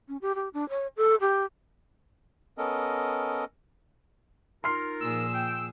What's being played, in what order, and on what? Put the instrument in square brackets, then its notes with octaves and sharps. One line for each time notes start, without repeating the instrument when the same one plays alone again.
[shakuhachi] C#4
G4
G4
D4
C#5
A4
G4
[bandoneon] B3 C#4 A4 A#4 D#5
[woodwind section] D#4 F4 A#4 [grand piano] C6 F6 C7
[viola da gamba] A#2 F3 G#4 [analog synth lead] E6
[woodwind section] G5